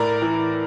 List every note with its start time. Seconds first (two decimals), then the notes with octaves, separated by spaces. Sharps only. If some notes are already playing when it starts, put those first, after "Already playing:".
Already playing: A2 A#4 D5
0.22 E3